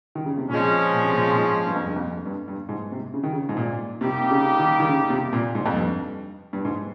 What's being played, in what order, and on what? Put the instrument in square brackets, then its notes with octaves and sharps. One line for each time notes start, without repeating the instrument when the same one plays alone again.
[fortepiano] D#3
C#3
C3
[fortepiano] A#2 [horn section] F3 G#3 C#4
[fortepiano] A#2
C3
A#2
A#2
G#2
G2
F2
G2
F2
G2
G2
G#2
C3
C#3
D#3
C#3
G#2
A#2
[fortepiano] C3 [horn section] G3 A#3 D#4 G4
[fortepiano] C#3
D#3
D#3
C#3
C3
A#2
G#2
F2
G2
G2
G#2